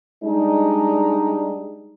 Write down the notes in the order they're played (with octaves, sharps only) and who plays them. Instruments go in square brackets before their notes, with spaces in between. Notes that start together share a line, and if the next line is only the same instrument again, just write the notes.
[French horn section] G3 G#3 D4 D#4